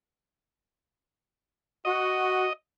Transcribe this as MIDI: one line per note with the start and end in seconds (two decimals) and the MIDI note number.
1.85 2.46 66
1.85 2.53 75